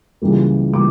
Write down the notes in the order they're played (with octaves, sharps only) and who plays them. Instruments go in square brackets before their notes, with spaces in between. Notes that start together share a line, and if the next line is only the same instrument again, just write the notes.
[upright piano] C#2 C#3 E3 G3 A#3
C#3 E3 G3 A#3 D6